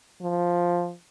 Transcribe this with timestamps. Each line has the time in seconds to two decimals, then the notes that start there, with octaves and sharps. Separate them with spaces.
0.22 F3